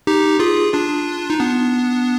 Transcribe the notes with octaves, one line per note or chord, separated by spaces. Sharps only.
D#4 G4
F4 G#4
D4 F4
D#4
B3 D4